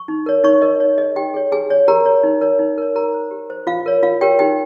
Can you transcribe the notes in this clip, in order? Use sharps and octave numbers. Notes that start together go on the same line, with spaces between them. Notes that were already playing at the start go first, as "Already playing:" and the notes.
Already playing: C#6
D#4
A#4 C#5
D#4 C#5 C#6
A#4 C#5 D#5
D#4 C#5
G#4 C#5 D#5
D#4 G4 G5
G#4 C#5
G4 G#4 G#5
C#5
G4 A#4 A#5
C#5
D#4
A#4 C#5
D#4
A#4 C#5
G4 A#4 A#5
C5
G4
C5
F4 F5
A#4 C#5
F4 F5
G4 A#4 C#5 G5
D#4 G4 G5